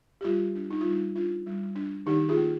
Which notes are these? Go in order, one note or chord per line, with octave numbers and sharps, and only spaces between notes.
G4
G3 F4
D4
D#4
G3 F4
D#4
D4 F4
G3
D4
D#3 D#4 G4
F4 G#4
A#3